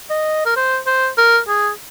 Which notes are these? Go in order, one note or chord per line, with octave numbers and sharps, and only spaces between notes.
D#5
A#4
C5
C5
A#4
G#4